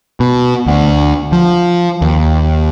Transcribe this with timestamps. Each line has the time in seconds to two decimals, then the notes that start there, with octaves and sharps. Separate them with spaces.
0.20 B2
0.67 D2
1.32 F3
2.02 D#2